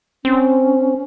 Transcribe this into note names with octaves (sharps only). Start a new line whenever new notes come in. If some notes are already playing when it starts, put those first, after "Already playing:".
C4 C#4